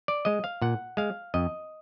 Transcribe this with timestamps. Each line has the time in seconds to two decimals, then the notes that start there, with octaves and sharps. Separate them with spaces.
0.08 D5
0.25 G#3 D#5
0.44 F5
0.62 A#2 F#5
0.97 G#3 F5
1.34 F2 D#5